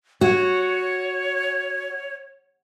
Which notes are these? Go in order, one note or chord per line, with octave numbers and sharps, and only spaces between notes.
F#4 C#5